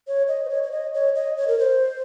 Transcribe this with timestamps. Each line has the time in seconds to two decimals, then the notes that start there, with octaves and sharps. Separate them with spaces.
0.08 C#5
0.28 D#5
0.45 C5
0.50 C#5
0.63 C#5
0.71 D#5
0.94 C#5
1.15 D#5
1.37 C#5
1.48 A#4
1.59 C5